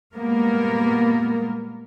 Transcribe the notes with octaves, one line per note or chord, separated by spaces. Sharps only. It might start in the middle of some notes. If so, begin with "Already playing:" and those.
A#2 G3 G#3 A#3 B3 A#4